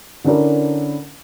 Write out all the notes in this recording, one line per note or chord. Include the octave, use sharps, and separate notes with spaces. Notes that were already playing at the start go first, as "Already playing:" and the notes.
D3 C#4 D4 E4 A#4